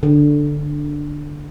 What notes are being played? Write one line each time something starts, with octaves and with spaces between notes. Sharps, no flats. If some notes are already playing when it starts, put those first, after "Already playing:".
D3